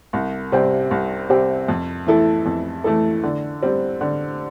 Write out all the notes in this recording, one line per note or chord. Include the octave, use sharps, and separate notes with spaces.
C2
C3 G3 C4 G4
C2
C3 G3 C4 G4
F2
E3 A3 E4 A4
F2
E3 A3 E4 A4
D3
G3 C4
D3